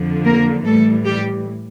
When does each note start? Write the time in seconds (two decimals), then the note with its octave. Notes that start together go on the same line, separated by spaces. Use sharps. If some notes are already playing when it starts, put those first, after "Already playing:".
Already playing: F2 D3 F3
0.25 A#3 A#4
0.65 A2 E3 G3 A3 A4
1.05 G3 G4